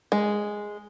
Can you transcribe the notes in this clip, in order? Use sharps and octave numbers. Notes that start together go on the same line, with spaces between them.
G#3